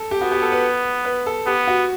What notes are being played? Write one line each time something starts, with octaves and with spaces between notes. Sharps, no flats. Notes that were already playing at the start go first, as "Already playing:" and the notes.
Already playing: A4
G4
B3 F#4
G4
A4
B4
B4
A4
B3 G4
F#4